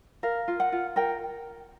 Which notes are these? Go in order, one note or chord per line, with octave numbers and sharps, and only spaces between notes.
A#4 F5
F4
F#5
F4
A#4 G5